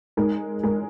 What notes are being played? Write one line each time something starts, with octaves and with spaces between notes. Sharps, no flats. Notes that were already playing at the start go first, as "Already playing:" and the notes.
G#3 D#4 A#4
G#3 D#4 A#4